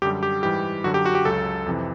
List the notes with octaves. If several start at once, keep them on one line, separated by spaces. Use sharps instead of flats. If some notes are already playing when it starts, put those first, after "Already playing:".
F#2 D3 G3 G4
G4
G#2 E3 G3 G4
F#2 D3 F#3 F#4
G4
F#4
G4
C#2 C#3 F#3 A4
F2 C3 E3